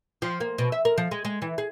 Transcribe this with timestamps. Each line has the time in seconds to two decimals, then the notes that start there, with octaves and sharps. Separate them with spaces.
0.22 F3
0.40 A#3
0.58 B2
0.72 E5
0.85 A#4
0.98 F3
1.11 G#3
1.25 G#3
1.42 E3
1.58 G#4